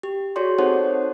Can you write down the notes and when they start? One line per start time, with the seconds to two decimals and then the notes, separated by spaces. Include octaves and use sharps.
0.03 G4
0.36 F#4 G#4 C#5 D5 C6
0.59 C4 D#4 A4 C5 C#5 F#5